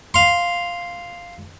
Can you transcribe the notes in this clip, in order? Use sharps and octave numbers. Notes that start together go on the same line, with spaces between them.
F5 C6